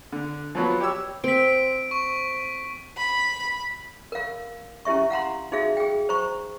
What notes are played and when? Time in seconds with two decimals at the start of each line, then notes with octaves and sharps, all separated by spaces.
0.12 D3
0.55 F3 F#3 B3
0.81 G4 C#5 E6
1.24 C4 B6 D7
1.91 C#6
2.97 B5
4.12 A#4 F5
4.85 C#4 E4 G4 E5 C#6
5.10 F5 F#5 A#5 C6
5.52 D#4 F#4 G#4 E5 F5
5.77 G#4 G5
6.09 C5 A#5 C#6